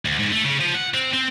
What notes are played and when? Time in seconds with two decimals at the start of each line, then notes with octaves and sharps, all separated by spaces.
0.05 D2
0.19 G#2
0.32 A3
0.45 C#3
0.61 F3
0.75 F#5
0.94 C4
1.13 C4